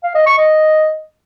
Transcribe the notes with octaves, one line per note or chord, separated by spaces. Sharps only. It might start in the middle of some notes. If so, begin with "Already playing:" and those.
F5
D#5
C#6
D#5